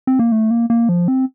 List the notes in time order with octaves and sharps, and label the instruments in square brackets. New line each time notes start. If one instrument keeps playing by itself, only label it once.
[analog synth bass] C4
A#3
A3
A#3
A#3
F3
C4